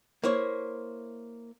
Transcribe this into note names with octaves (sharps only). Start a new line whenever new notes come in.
A#3 E4 C5 C#5